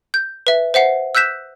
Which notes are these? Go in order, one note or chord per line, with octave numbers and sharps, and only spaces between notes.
G6
B4 E5
C5 E5 F#5 C7
E6 F#6 G6 B6 E7